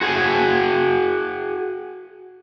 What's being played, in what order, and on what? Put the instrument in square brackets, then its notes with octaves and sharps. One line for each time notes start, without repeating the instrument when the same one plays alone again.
[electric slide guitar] F#4 G#4